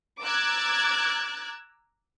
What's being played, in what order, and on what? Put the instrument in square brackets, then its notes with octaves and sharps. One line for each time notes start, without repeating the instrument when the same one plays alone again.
[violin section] A#5 D6 E6 F#6 G#6 A6